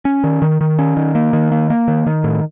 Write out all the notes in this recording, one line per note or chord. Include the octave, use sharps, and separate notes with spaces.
C#4
D#3
D#3
D#3
C#4
D#3
A#3
D#3
A#3
A#3
D#3
D#3
A2